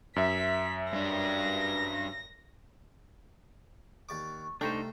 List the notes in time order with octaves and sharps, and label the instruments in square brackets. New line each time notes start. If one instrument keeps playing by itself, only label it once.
[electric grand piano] F#2 E5 [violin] B6
[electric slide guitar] G2 D4 [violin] A#6
[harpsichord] D#2 D5 D6 [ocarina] C#6
[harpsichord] C2 A3 G5 [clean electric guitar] D4 D#4 C5 [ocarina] C#6